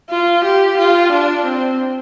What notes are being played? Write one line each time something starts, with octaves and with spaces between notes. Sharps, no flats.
F4
G4
F4
D4
C4